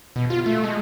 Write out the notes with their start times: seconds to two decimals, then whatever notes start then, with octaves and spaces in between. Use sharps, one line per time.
0.16 B2
0.30 F4
0.46 A3
0.64 G#3